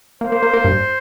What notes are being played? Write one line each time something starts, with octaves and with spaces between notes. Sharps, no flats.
A#3 C5
A#3
A#3
A#3
G2